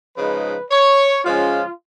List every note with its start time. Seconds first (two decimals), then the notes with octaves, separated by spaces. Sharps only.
0.17 C#3 F3 G#3 D#4 B4
0.71 C#5
1.24 C#3 F3 G#3 C#4 F4